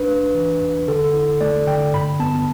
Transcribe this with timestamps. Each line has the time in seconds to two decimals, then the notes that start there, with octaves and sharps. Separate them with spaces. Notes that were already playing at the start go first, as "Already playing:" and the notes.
Already playing: D4 B4
0.08 A3
0.34 E3
0.61 E2
0.88 D3 A4
1.13 E4
1.41 A3 D5
1.67 D3 G5
1.93 G2 B5
2.20 B3 A5